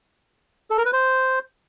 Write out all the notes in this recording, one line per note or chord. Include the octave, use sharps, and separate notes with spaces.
A4
A#4
B4
C5